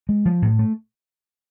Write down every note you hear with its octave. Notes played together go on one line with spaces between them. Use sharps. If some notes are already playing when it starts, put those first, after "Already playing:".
G#3
F3
A2
A3